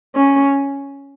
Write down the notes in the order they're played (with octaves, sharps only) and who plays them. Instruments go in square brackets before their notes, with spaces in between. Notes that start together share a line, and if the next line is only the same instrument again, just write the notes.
[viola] C#4